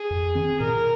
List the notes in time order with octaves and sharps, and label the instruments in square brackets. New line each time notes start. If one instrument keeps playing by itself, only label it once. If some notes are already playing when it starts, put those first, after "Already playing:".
Already playing: [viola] G#4
[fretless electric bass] F2
D#3 C4
[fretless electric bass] A#2 [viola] A#4